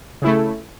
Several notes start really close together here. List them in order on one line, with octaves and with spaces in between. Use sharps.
C#3 E4 A3